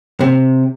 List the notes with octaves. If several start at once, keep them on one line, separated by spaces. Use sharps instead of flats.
C3